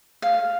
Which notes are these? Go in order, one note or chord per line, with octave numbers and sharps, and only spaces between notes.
F5